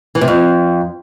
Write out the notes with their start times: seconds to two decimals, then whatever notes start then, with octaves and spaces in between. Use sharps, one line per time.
0.15 E3
0.21 C3
0.28 F2